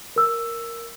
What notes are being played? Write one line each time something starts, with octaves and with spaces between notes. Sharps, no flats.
A#4 E6